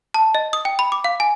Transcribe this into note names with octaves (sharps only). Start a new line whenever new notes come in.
A5
D#5
D#6
G5
B5
D6
F5
G#5